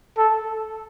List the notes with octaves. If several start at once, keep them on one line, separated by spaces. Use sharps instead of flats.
A4